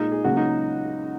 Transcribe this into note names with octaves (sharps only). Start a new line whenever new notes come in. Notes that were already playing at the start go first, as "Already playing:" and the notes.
Already playing: A#2 G#3 D#4
G#4
C#2 C#3 F#3 A#3 F#4
D#4